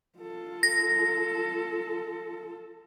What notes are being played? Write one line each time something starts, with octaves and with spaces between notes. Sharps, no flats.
F4 A4
A#6